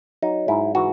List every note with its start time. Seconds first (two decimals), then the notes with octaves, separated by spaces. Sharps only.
0.22 F#3 D#4
0.48 G#2 E4
0.75 E3 F#4